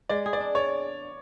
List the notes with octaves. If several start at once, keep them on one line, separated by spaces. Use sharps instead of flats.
G#3 D5
G#4
D5
D4
C#5 D5